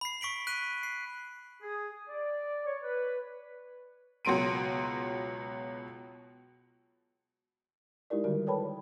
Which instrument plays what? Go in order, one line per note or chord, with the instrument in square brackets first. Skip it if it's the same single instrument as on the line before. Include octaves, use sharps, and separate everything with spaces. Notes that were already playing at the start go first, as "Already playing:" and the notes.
[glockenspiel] B5 C7
C#6 B6 D7 F#7
F#6 B6 D#7
C7
[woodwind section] G#4
D5
C#5
B4
[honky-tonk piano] C#2 B2 F#3 C6 D7 D#7
[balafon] G#3 D#4 E4 G4 A#4 D5
D3 D#3 G3 F#4 A#4
A4 B4 C#5 G5 A5 B5